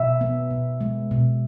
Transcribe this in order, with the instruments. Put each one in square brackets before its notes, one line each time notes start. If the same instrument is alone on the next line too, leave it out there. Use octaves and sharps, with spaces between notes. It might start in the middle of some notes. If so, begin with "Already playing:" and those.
Already playing: [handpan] B2 E5
B3
B2
G#3
B2